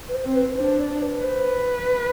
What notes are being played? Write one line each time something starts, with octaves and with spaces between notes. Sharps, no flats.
B4
C5
C4 C5
B4
B4
D4 C5
D5
B4
B4 C5